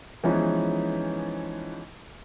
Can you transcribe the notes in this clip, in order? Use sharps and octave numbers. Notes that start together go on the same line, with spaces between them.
E3 F3 G#3 B3 C#4 D#4